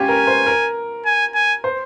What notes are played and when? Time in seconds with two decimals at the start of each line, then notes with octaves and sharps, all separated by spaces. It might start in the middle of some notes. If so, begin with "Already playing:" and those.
Already playing: C#4 F4 G4 G#5
0.08 A#4
0.27 C5
0.46 A#4
1.05 G#5
1.34 G#5
1.64 C5